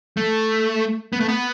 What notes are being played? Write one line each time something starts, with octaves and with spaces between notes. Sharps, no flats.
A3
B3
A3
B3